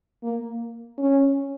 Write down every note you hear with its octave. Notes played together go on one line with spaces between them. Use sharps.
A#3
C#4